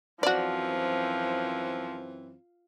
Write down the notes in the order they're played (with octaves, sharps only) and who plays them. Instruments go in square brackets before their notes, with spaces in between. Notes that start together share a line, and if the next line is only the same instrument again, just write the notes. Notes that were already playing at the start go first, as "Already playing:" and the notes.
[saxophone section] F#2 E3 C4 [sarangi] F3 [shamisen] F#4 D5